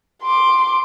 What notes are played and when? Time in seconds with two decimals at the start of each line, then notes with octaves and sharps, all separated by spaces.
0.23 C6 D6